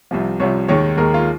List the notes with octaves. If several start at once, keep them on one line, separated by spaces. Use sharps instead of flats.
C2 C3 F3
C2 C3 F3 C#5
D#2 D#3 G#3 C#5
D#2 D#3 G#3 A#4
F4